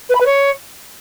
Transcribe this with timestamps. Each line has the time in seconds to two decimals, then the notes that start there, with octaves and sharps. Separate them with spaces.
0.10 B4
0.15 B5
0.20 B4
0.26 C#5